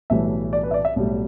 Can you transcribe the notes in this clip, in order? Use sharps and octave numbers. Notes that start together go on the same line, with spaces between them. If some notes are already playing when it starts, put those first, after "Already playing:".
B1 A2 E3 G3 E5
D5
B4
E5
D5
E5
B1 A2 G3